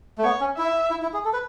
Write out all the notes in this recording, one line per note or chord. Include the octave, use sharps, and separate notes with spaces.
A3
B3 C#5
C#4
E4 E5
E4
E4
G#4
A4
B4